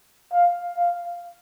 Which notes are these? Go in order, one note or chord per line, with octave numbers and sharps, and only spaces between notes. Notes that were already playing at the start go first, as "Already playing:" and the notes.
F5
F5